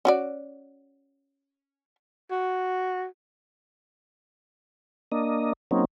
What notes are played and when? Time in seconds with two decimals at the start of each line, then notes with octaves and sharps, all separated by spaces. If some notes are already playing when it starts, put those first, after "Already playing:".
0.05 C#4 F#4 D5
2.31 F#4
5.12 A#3 D4 D#5
5.71 F#3 A#3 C4 C#4 D#4